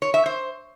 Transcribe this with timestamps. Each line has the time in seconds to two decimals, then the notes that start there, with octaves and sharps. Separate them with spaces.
0.02 C#5
0.14 E5
0.26 C5